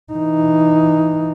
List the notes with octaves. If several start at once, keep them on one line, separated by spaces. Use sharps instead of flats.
E3 D#4